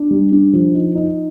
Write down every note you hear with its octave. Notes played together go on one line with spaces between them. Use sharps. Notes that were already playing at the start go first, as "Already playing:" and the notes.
Already playing: D4
G3
D4
F3
D#4
D#4